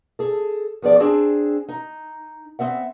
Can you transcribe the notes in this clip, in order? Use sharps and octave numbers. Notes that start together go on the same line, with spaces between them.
G#4 A4
F3 B3 G#4 D5
C4 D4 G#4 G#5 A5
D#4
B3 C4 E5 F#5